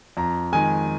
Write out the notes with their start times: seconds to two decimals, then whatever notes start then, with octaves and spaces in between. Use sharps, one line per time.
0.17 F2 A#5
0.52 D#3 G#3 G#5